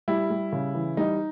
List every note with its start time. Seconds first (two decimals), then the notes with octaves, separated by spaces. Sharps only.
0.08 G3 E4
0.30 G3
0.52 C#3
0.75 E3
0.97 G3 D#4